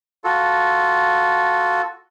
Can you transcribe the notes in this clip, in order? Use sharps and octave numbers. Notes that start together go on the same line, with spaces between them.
F4 F#4 A4